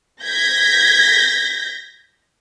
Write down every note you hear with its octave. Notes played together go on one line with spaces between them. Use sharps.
G6 G#6 A#6 B6